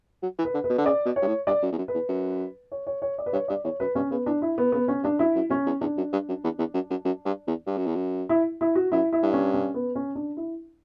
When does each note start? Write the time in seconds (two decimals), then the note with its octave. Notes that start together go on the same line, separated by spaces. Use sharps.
0.23 F#3
0.38 E3
0.44 B4
0.54 D3
0.64 B4
0.70 B2
0.78 D3
0.85 C#3 D5
1.05 B2
1.16 C#5
1.22 G2
1.27 A2
1.47 G2 D5
1.63 F#2
1.72 E2
1.78 F#2
1.88 B4
1.94 E2
2.09 F#2
2.72 C#5
2.87 C#5
3.02 C#5
3.18 D5
3.26 B4
3.33 G2 C#5
3.48 G2 D5
3.64 E2 C#5
3.80 F#2 B4
3.95 G2 C#4
4.11 C#3 B3
4.26 E3 D4
4.42 E4
4.58 B3
4.72 C#3 B3
4.88 D3 C#4
5.03 G2 D4
5.19 F#2 E4
5.35 F#2
5.50 F#2 C#4
5.66 E2
5.81 E2 D4
5.97 F#2
6.13 G2
6.29 F#2
6.44 E2
6.59 E2
6.74 F#2
6.90 F#2
7.05 F#2
7.26 G2
7.47 E2
7.67 G2
7.77 F#2
7.86 E2
7.96 F#2
8.29 E4
8.61 E4
8.75 F#4
8.92 F#2 E4
9.13 E4
9.23 G2
9.33 C#4
9.54 C#4
9.74 B3
9.95 C#4
10.15 D4
10.37 E4